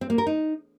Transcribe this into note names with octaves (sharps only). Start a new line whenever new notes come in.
C4
A#3
A#4
D#4